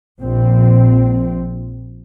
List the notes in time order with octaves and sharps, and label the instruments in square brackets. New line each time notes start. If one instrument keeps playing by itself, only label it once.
[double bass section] A#1 C4